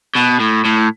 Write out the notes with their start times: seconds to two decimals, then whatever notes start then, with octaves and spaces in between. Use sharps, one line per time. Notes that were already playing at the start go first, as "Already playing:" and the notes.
0.16 B2
0.40 A2
0.66 A2